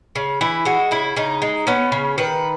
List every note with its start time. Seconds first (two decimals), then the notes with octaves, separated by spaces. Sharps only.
0.15 C#3
0.41 E3 E4
0.65 G#3 F#4
0.91 C#3 E4
1.16 C#3 D#4
1.42 G#3
1.67 B3 C#4
1.92 C#3
2.18 D#3 B4